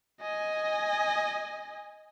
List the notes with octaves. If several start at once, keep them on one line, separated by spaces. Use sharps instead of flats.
D#5 G#5